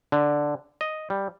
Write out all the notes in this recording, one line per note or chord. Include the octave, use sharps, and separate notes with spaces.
D3
D#5
G3